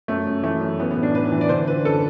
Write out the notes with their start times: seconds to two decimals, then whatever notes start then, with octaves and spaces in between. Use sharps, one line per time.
0.08 F#2 A3
0.27 F#2
0.43 E3 A3
0.61 F#2
0.79 E3 B3
0.90 B3
0.96 A2
1.03 D4
1.14 A2 B4
1.32 E3
1.41 D5
1.49 D3 C5
1.67 D3 B4
1.85 F#2 A4